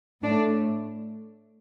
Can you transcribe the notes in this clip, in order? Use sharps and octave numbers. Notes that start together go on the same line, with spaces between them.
A2 A3 D4